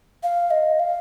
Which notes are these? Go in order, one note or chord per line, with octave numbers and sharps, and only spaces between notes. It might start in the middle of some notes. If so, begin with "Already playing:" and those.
F5
D#5
F5